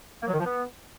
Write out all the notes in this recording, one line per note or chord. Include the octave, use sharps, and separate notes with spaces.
A#3
F#3
D#3
F3
B3